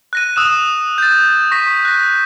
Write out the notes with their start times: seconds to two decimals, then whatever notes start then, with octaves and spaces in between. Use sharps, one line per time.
0.13 F#6 A#6 D#7
0.36 D#6 E6 F#6 E7
0.98 G6 A6
1.51 C#6 A#6 B6
1.85 F#6 A#6